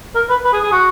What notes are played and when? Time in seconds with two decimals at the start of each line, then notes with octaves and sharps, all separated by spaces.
0.15 A#4
0.30 B4
0.45 B4
0.53 G#4
0.63 G#4
0.72 F#4